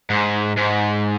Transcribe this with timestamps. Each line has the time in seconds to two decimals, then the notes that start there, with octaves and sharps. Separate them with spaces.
0.10 G#2
0.57 G#2